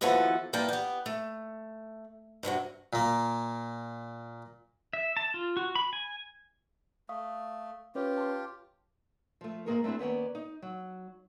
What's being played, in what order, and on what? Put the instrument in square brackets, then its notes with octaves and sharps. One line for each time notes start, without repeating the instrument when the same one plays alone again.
[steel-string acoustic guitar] D#2 E3 F3 B3 F#4 A4
E3 G3 A#3 G5 A5
B3 G4
A3
G2 C3 E3 F#3
[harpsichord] A#2 A#3
[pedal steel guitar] E5
A5
F4
F#4
B5
G#5
[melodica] A3 [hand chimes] F5 C#6 D#6
[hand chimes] C#4 B4 C#5 [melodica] F4 G4
[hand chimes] A5 C6
[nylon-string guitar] F3 A3
G#2 B2 A#3 G#4 A#4 C#5
A3 C4 D4 E4 G#4
D#2 B3 C#4 D5
D#4
F#3